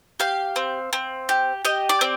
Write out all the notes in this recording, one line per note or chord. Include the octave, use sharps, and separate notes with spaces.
G4 F5
C4
C4
G4
G4 D#5
D5
C4